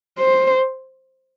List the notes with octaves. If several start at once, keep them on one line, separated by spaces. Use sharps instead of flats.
C5